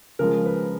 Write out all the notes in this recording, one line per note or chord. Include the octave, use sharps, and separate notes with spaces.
C#3 F3 G#3 A#4
B4